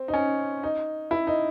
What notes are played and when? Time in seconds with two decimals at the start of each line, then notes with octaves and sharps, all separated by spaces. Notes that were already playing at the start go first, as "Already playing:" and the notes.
Already playing: C4
0.08 D#4
0.13 C#4
0.63 D#4
1.11 E4
1.27 D#4